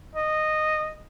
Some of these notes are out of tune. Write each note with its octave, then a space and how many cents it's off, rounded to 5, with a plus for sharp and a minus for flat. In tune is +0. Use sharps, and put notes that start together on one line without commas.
D#5 -10